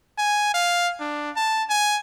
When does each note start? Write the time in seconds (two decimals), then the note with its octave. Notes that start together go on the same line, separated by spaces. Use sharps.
0.18 G#5
0.54 F5
1.00 D4
1.36 A5
1.69 G#5